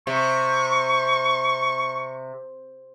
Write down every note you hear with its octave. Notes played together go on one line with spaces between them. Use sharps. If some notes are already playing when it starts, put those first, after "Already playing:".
C3 C#6